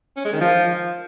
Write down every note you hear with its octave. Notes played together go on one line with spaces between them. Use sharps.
C#4
G#3
D#3
F3